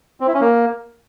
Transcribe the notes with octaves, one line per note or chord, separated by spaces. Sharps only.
C4
E4
C#4
A#3